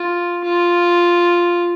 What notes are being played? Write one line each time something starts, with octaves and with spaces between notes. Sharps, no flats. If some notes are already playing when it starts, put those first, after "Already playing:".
Already playing: F4
F4